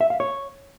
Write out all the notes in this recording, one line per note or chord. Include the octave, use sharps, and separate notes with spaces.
E5
F5
C#5